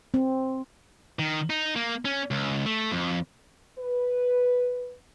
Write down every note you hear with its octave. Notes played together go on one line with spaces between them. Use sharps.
C4
D#3
D#4
A#3
C#4
C#2
A3
F2
B4